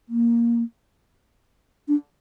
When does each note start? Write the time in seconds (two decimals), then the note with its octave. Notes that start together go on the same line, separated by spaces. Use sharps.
0.09 A#3
1.88 D4